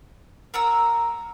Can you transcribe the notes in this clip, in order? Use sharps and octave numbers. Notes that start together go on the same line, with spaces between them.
A#4 F#5 A#5 E6